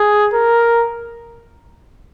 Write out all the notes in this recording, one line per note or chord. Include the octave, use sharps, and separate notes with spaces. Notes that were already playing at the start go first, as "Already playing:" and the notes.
Already playing: G#4
A#4